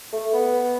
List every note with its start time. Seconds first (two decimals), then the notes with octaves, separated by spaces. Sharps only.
0.13 A3
0.33 B3